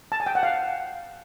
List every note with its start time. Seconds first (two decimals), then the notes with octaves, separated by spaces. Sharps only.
0.12 A5
0.20 G#5
0.26 G5
0.35 F#5
0.43 F5